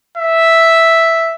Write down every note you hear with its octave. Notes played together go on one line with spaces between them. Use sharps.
E5